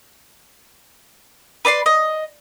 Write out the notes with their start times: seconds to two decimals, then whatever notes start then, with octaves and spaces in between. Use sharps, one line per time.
1.65 B4 D5 E5 C6
1.86 D#5